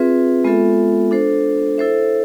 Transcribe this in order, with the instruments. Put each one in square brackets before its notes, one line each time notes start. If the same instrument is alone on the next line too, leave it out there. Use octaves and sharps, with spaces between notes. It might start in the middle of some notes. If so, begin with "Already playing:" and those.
Already playing: [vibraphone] C4 F4 G#4 B4 E5
G#3 B3 F4 A4 E5
D4 A4 C5
E4 A4 C5 E5